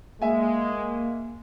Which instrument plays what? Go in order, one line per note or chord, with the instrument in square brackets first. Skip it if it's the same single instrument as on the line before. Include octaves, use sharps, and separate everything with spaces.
[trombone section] G#3 [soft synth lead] A#3 [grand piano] E5 G#5